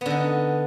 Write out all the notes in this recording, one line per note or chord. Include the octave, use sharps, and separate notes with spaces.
D3 B3 D#4